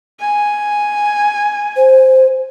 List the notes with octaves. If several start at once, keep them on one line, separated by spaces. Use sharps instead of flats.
G#5
C5